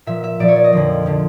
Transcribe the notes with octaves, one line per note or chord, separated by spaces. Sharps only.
A#2 F3 E5
E5
A#2 F3 D5
C#5
D5
D#5
F2 D3 F3
D3 F3